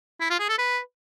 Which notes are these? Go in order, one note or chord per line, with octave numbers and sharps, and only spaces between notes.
E4
F4
G#4
A4
B4